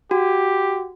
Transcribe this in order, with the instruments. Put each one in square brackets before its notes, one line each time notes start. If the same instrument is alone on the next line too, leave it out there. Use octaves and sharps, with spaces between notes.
[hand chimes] F#4 [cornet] G4